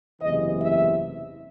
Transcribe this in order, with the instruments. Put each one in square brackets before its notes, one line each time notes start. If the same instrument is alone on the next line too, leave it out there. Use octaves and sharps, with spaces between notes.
[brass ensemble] F#1 E2 C3 E3 D#5
E5